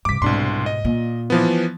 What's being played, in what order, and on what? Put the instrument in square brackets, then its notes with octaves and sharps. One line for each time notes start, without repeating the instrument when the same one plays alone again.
[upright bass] G2 C3 [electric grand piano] D6 B6
[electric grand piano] C2 D4 C6 [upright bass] G#2 B2
[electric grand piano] D#5
[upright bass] A#2
[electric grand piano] E3 F3 B3